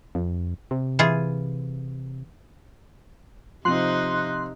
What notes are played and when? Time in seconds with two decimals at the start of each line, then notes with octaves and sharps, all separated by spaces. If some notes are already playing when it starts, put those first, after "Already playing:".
0.15 F2
0.71 C3
0.99 E3 F4 G#4
3.65 C3 F3 C4 D#4 C6 F#6